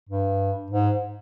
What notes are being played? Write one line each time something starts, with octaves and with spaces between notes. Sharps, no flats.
G2
G#2